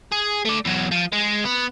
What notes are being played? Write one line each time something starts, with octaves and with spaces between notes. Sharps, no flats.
G#4
A3 D5
E2 F#3
F3
G#3
B3